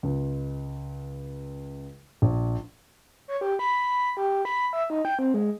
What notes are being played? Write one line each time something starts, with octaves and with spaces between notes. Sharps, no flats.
C#2
A#1
C#5
G4
B5
G4
B5
E5
D#4
G5
C4
G#3